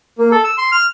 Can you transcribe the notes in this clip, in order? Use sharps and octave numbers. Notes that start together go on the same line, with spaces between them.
A#3
A4
E6
C6
F6